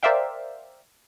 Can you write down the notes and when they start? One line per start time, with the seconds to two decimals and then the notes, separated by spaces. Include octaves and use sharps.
0.03 A#4 C5 D5 E5 F5 G5